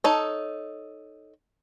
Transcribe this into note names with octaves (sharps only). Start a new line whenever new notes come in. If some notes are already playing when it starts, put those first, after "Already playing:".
D#4 A4 C#5